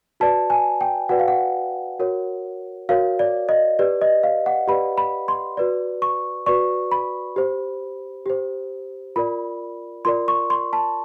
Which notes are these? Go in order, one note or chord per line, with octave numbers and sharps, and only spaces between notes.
F#4 B4 D5 A5
G#5
G5
F#4 B4 D5 F#5
F5
F#5
F#4 A#4 C#5
F#4 A#4 C#5 F5
D5
D#5
G4 B4 D5
D#5
F5
F#5
G4 B4 D5 B5
B5
C6
F#4 B4 D5
C#6
F#4 B4 D5 C#6
B5
G4 C5
G4 C5
F4 A#4 D5 B5
F4 A#4 D5 C6
C#6
C6
A5